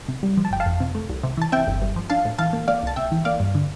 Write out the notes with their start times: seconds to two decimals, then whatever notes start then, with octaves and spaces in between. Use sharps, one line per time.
0.08 C3
0.23 G3
0.37 F3
0.45 A5
0.51 G1 G5
0.60 F5 A5
0.66 F2
0.80 C3
0.95 A3
1.09 C2
1.23 C3
1.37 E3 A5
1.52 C4 E5 G5
1.68 G1
1.82 G2
1.96 F3
2.10 D4 F5 A5
2.25 A2
2.38 E3 F5 A5
2.53 A#3
2.68 A#3 D5 F5
2.83 C2 A5
2.96 C3 E5 G5
3.12 E3
3.25 A#3 D5 F5
3.40 G2
3.55 D3